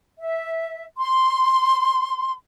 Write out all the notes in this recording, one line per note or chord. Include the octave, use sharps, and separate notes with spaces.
E5
C6